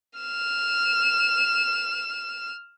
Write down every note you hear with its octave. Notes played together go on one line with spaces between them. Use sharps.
F6 E7